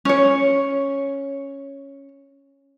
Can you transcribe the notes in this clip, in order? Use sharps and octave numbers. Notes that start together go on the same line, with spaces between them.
C#4 C#5